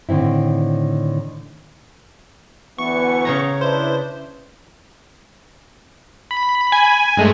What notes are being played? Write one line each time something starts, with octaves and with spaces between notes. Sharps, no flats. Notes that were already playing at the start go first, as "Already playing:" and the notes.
A2 D3 D#3 C4 E4
D2 E3 B3 C#6
C#3 C#5 A#5
D4 E4 B4 C5
B5
G#5
G2 G#3 A3